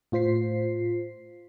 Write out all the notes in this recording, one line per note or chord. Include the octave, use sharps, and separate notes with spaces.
A2 F4 C5 B6 C7